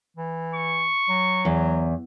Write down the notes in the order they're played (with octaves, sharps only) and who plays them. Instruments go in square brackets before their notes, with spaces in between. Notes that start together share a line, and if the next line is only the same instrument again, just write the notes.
[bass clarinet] E3
[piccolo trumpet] C#6
[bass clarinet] F#3
[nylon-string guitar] E2